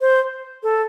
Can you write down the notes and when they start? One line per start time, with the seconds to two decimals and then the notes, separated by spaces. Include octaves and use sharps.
0.01 C5
0.63 A4